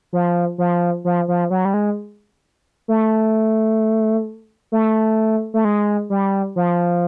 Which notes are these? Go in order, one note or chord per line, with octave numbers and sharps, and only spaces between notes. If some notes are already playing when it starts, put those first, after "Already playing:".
F3
F3
F3
F3
F#3
G3
G#3
A3
A3
A3
G#3
G3
F3